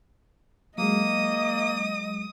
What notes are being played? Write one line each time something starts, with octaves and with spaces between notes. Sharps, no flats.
F#3 G#3 A#3 D#5 D#6